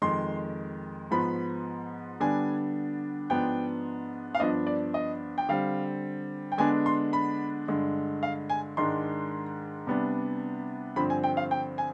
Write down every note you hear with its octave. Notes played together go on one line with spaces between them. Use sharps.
F2 D#3 G#3 C6
G#2 F3 B3 B5
D3 G3 B3 D4 G#5
G#2 F3 B3 D4 G5
F5
G2 F3 B3 D4 D#5
D5
D#5
G5
D3 G3 C4 F5
G5
D3 G#3 B3 D4 G#5
C6
B5
G2 D3 G#3
F5
G#5
G#2 D#3 G#3 D4 C6
C3 G3 B3 D4
G2 D3 F3 C4 B5
G#5
G5
F5
G5
G#5